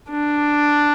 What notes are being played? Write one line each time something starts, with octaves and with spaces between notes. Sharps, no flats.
D4